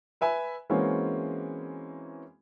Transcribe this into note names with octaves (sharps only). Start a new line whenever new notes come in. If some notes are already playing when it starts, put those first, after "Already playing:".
B4 E5 G#5 B5
E3 G#3 A#3 C4 C#4 F#4